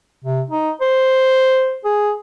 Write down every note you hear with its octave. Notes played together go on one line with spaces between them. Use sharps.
C3
D#4
C5
G#4